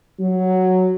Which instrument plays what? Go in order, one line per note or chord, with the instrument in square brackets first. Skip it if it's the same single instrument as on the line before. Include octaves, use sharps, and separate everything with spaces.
[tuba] F#3